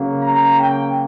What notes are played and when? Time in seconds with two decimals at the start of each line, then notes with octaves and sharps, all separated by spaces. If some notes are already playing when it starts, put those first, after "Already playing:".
Already playing: C#3 F#3 A#3
0.22 A#5
0.60 G5